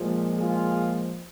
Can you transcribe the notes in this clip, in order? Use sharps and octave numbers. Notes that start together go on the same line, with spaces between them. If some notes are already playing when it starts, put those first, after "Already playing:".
Already playing: A#2 F3 G#3
F4 G#4